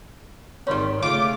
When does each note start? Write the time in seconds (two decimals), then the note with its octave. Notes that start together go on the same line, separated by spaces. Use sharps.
0.67 G#1 D#3 G3 C#4 C#5 C6 C#6
1.02 C#3 A3 F4 D6